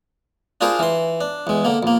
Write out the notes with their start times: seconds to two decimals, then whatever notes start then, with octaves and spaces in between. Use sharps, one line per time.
0.61 D4 F4 G#4 A#4 C5
0.79 E3 C6
1.21 D4
1.47 E2 G#3
1.65 D3 A#3
1.83 A#1 A#3